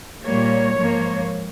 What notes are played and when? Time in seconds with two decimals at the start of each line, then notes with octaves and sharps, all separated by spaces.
0.23 A#2 G3 A#3 C#5
0.76 G#2 F3 A#3